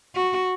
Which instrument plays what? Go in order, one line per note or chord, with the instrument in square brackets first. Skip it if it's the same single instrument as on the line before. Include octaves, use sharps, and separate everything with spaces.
[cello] F#4